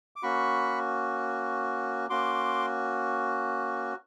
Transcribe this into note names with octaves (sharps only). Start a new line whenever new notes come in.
D6
A#3 C#4 F#4 B5 C#6
A#3 C#4 F#4 C6 D6